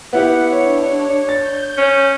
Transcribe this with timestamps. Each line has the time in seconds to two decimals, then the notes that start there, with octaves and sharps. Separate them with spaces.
0.13 B3 E4 G4 F#5
0.51 D4 C#5
1.29 G6 A6
1.78 C#4